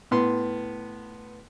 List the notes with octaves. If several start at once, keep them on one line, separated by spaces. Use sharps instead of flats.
A2 B3 C6